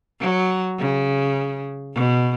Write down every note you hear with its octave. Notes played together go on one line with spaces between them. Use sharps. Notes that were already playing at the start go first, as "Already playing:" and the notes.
F#3
C#3
B2